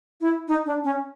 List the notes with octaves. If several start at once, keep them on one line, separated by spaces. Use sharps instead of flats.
E4
D#4
D4
C#4